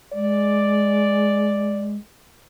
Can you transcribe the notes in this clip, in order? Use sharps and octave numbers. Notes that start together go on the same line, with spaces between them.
G#3 D5